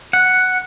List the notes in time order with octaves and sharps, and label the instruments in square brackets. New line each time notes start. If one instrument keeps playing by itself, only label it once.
[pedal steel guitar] F#5